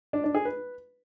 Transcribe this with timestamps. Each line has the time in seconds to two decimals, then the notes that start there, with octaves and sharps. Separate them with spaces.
0.13 D4
0.24 D4
0.35 G#4
0.45 B4